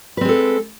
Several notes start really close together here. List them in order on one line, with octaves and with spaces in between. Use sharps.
B4 C4 G#3 A4